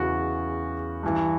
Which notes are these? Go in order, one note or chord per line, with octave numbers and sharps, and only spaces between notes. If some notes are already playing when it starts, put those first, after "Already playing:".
Already playing: E2 C#3 E3 F#4
G2 E3